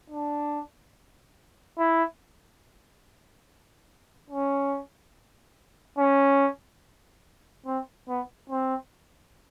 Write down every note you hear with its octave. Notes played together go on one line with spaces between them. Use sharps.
D4
E4
C#4
C#4
C4
B3
C4